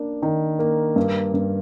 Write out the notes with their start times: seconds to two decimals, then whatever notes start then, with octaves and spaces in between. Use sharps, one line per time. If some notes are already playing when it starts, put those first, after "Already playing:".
Already playing: A#3 D4
0.22 D#3
0.59 A#3
0.96 G2
1.34 G2